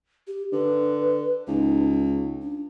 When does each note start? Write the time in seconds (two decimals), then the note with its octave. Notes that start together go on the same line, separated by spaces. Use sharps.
0.27 G4
0.52 D3 B4
1.48 C#2 D#4
2.42 D4